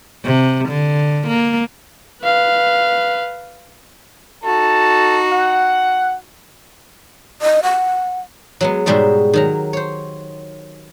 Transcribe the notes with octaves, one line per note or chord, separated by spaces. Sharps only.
C3
D3
A#3
B4 F5
D#4 F#4 A4 A5
F#5
D#5
F#5
F#3 G#3 B3
G#2 B2 G3 G#3 F#4 E5
D#3 F#3 A#5
C5 C#5